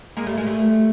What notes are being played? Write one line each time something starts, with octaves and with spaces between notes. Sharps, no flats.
G#3 A#3
G3 A3
G#3 A#3
G3 A3